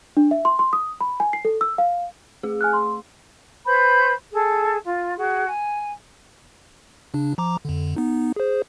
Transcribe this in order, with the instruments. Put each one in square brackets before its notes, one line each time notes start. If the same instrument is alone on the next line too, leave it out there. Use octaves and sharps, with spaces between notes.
[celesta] D4
E5
C6
C6
D#6
B5
G#5
C7
A4
E6
F5
[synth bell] A3 G#4
[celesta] G#5 F6 F#6
C6
[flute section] B4 C5 B5 G6
G#4 A4
F4
F#4 G#4
G#5
[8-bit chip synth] C#3 D4
F3 A#5 D6
F2 D3
B3 D#4
G#4 C5